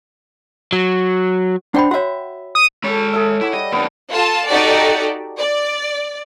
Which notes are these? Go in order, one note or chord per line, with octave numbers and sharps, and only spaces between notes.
F#3
D4 C5 F#5 G5 B5
F#4 C#5 E5 F#5
D#6
G#3 A4 C#5 B5
G#4 A4 E5
E4 F#5 D6
G3 D#5
F2 A#3 B3 D4
F4 A4 A5
D#4 F#4 G4 A4 D5
D5